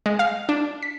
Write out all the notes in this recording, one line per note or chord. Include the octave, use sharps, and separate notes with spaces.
G#3
F5
D4
B6